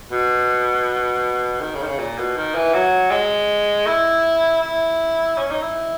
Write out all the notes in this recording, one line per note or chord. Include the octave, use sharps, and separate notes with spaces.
B2
D#3
C#3
D#3
C#3
A#2
B2
D#3
E3
F#3
G#3
E4
E4
C#4
D#4
E4